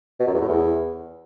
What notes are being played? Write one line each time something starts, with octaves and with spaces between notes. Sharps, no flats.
B2
F#2
E2
A2
E2